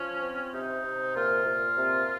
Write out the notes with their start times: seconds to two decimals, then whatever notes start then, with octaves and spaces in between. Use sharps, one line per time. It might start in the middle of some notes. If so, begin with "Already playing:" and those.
Already playing: F3 C#4
0.22 C4
0.53 C3 D#4
0.84 C3
1.15 A#2 F4
1.46 A#2
1.76 C3